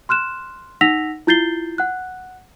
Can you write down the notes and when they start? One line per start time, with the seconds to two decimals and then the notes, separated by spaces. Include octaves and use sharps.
0.09 C6 F6 F#6 E7
0.81 D#4 F#5 E6 A#6 B6 F7
1.27 E4 F4 G6 A6 C7 G7
1.78 F#5 F#6